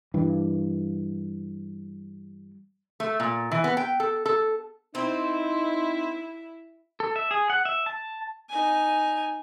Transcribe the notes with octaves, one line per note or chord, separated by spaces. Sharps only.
G2 E3
A3
A#2
E3
B3
G5
A4
A4
C4 D#4 E4
A4
E5
G#4
F#5
E5
A5
D#4 G#5